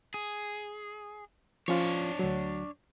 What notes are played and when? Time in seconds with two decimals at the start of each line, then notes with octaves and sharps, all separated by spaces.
0.14 G#4
1.68 F3 C#4 D4 F4 C#5
2.19 D2 F#3